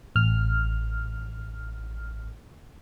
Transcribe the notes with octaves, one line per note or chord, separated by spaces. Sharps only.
A1 F6